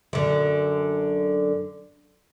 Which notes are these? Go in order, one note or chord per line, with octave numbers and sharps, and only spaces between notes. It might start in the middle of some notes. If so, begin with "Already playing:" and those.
F#2 D3